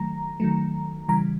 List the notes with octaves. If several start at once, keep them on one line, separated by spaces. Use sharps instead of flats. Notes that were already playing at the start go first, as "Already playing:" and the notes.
Already playing: D#3 F#3 A3 A#5
D#3 F#3 A3
C#3 E3 G3 A#5